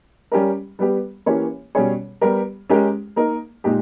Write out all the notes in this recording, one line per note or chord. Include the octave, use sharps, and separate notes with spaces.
G3 C#4 G4 A#4
G3 B3 G4
E3 A#3 C#4 G4 C#5
B2 G3 C#4 G#4 C#5
G3 B3 G4 A#4
G#3 C#4 G4 A#4
A#3 D#4 A#4
A#2 G#3 D#4 G4